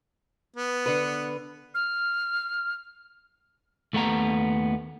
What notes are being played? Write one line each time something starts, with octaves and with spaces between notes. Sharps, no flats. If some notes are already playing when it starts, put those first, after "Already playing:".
B3
D3 B4
F6
D#2 A3 B3 F#5 A#5